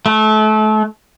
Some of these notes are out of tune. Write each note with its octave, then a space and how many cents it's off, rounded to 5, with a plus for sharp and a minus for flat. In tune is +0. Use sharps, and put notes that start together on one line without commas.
A3 -30